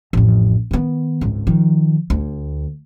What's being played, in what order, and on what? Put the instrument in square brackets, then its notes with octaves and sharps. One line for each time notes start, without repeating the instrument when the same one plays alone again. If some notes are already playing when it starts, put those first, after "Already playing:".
[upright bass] A1 F2
D#3 B3
G#1 C#2
D#3 F3
D2